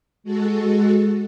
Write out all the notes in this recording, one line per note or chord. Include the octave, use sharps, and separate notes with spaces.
G#3 F#4 A4